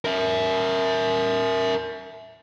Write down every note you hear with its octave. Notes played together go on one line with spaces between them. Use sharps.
A#4 E5